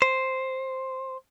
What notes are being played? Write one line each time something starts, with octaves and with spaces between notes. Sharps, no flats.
C5